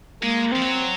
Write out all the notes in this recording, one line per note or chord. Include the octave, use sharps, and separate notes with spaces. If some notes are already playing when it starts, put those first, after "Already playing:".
G#3 A#3
F3 C4
F#3